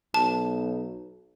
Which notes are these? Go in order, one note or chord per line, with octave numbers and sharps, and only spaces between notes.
B1 A5